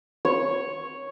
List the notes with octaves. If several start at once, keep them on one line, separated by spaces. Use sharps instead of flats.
C#5